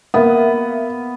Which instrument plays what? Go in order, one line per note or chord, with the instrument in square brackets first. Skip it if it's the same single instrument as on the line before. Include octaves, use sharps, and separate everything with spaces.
[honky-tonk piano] A#3 E5 [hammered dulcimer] B3